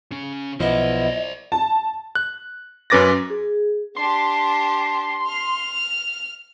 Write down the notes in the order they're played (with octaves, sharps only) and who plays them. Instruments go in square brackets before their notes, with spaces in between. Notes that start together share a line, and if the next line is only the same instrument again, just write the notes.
[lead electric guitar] C#3 C#4
[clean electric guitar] B1 F3 [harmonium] B3 E4 [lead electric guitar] C5 D5 [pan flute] D#5
[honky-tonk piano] A5
[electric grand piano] F#6
F#2 C#4 B4 D6 A6 A#6
[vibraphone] G#4
[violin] D4 G4 [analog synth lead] C6
[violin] F6